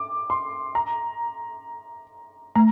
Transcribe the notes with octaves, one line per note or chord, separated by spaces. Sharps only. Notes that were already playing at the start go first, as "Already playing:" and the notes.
Already playing: D6
C6
A#5
A3 A#5